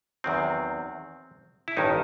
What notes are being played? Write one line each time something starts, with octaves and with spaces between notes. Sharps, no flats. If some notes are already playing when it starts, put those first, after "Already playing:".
E2 D#3 F#3 C4
E4
A1 G2 D#3 D#4